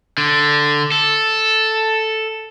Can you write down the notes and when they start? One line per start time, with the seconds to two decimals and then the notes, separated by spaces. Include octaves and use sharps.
0.18 D3
0.92 A4